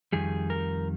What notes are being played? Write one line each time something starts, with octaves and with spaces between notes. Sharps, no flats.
F2 D#3 G3 G#4
A#4